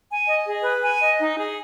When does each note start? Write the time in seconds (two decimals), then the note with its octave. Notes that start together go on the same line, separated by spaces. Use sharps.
0.10 G#5
0.28 D#5
0.46 G#4
0.64 B4
0.82 G#5
1.01 D#5
1.19 D#4
1.37 G#4